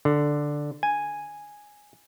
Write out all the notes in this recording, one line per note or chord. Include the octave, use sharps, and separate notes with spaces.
D3
G#5